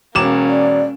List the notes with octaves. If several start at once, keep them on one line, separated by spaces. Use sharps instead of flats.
E1 A#3 C#4 D6 E7
D5